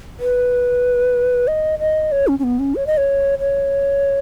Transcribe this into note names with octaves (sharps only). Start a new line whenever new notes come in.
B4
D#5
D#5
C#5
C#4
C#4
B3
C#4
C#5
D#5
C#5
C#5